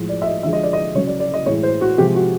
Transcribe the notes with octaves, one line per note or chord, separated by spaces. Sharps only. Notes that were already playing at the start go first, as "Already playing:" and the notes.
Already playing: A2 F3 G#3
D5
E5
D#5
D3 F3 G#3 E5
D#5
D5
D#5
C#3 F#3 C#5
D5
D5
D#5
A2 E3 G#3 C#5
C5
F#4
C3 F3 G#3 G4
F#4